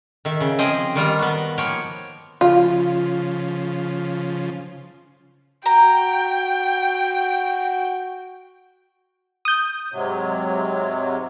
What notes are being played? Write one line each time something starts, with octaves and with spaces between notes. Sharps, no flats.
D#3 E5
C#3
F3 C4 G#4 C5 D#5 G5
D#3 G3 F4 A#5
B3 F#4
F3 A#3 C#5 G5
C#3 F3 F4
F#4 G5 A#5
D#6 G6
G#2 C3 F#3